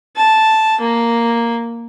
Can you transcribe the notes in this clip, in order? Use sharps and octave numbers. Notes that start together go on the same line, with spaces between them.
A5
A#3